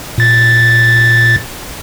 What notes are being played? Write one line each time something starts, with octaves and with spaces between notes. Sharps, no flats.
A#2 A6